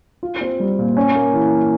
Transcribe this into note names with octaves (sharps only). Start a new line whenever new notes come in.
F4
C4
G3
A#2
C#4
A#3
E3